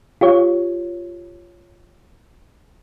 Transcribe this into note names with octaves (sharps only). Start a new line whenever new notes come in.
F4 G4 C#5